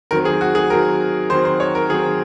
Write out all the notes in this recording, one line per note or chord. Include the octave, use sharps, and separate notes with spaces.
D#3 F#3 C4 A#4
G#4
F#4
G#4
D#3 F#3 C4 A#4
D#3 F#3 C4 C5
C5
C#5
A#4
D#3 F#3 C4 G#4